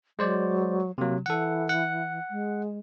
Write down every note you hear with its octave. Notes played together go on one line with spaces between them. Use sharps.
F#3 G#3 C5 D5
C3 F#3 A#3
E3 A4 F#5
F#5
G#3